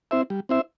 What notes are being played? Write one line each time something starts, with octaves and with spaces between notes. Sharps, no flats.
C4 E4 C5 E5
G3
C4 E4 C5 E5